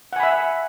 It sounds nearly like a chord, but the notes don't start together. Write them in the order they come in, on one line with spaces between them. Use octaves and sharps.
F#5 G#5 B5 E5